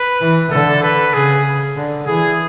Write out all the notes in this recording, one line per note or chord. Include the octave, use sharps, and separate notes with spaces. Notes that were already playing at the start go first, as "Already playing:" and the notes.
Already playing: B4
E3
D3 A4
B4
C#3 G#4
D3
E3 G#4